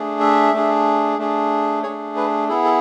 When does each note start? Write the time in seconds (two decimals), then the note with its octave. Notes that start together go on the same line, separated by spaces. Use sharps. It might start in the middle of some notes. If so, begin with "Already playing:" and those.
Already playing: A3 D4 G#4
0.21 E5
0.53 A3 D4 G#4
1.18 A3 D4 G#4
1.83 A3 D4 G#4 C#5
2.16 B4
2.48 B3 E4 G#4 A4
2.65 A4